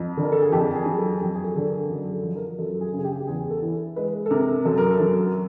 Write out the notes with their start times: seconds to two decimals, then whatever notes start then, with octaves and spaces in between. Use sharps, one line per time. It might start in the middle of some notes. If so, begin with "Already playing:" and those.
Already playing: F2
0.17 D3
0.23 A#4
0.32 A4
0.42 G#4
0.52 F2 G4
0.75 G#4
0.85 F#3
0.98 A4
1.21 F2 G4
1.35 G#4
1.44 A4
1.56 D3 A4
1.67 A#4
1.90 F#2 G#4
2.13 A4
2.23 F3
2.36 A#4
2.58 F#2 A4
2.74 A4
2.81 G#4
2.93 C#3
2.99 G#4
3.04 G4
3.20 G4
3.27 E2 G#4
3.50 A4
3.62 E3
3.96 G#3 B4
4.26 A4
4.31 C3 A#4
4.65 F#2 A4
4.78 A#4
4.91 A4
5.00 F#3